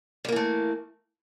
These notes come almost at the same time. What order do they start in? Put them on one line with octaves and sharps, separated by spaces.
G3 A#3 E3 A3